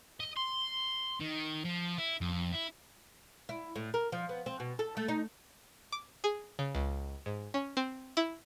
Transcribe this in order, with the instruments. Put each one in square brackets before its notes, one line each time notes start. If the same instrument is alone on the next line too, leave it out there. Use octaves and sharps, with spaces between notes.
[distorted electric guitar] D#5
C6
D#3
F3
E4
F2
E4
[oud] E4
A2
A#4
F3
B3
C4
B2
A4
A3
D#4
[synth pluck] D6
G#4
C#3
C#2
G#2
C#4
C4
E4